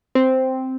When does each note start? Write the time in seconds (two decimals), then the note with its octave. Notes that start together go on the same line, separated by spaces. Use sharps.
0.15 C4